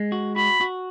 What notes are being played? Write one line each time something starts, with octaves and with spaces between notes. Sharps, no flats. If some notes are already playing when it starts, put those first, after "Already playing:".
Already playing: G#3
F#4
F#4 B5
F#4